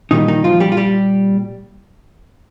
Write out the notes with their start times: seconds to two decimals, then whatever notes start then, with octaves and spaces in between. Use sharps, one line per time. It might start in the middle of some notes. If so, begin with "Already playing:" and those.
0.11 A#2 D#3 G3 D#4
0.28 D#3 D#4
0.44 F3 F4
0.60 G3 G4
0.72 F4
0.77 G3 G4